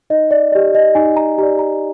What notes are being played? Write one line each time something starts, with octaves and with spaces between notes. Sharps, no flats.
D#4 D#5
D5
G4 D5 D#5
D5
D#5
D#4 G#5
A#5
G4 D5 A#5
A#5